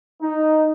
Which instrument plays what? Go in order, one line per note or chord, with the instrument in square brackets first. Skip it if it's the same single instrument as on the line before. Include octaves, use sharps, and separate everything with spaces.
[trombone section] D#4